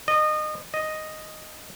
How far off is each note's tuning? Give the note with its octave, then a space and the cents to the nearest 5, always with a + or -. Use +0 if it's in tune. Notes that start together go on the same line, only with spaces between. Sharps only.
D#5 -25
D#5 +0